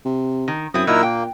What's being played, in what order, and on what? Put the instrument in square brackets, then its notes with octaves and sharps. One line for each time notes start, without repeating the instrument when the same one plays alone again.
[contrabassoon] C3
[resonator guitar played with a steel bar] D#3
[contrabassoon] F#2 [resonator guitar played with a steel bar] C4 E4 [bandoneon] D#6
[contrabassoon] A#2 [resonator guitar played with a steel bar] F#3 D#4 [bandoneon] E4 A#4 E6
[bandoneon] A#3 [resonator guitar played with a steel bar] G5